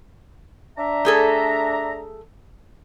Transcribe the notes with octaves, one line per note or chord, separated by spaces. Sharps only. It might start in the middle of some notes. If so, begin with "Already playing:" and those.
D4 E5 A#5
A3 G#4 A4